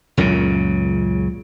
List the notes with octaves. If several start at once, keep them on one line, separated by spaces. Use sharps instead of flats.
C#2 F#2 A#2 C#3